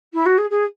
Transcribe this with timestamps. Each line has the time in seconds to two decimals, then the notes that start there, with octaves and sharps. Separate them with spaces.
0.13 E4
0.25 F#4
0.37 G#4
0.50 G#4